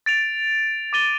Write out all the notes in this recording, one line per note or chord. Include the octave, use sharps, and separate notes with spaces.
A6 D7 F7
D6 A6 D#7 G7